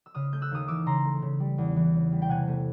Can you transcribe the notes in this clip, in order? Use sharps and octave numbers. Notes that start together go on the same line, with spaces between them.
E6
C#3 D#6 F6
A3 G6
E6 F#6
D#2 D#6 F6
E3 D6 E6
C#3 A#5 C6
A3
C#3
G3
E2
E3
C#3
G3
G5
C3 F#5 G#5
A3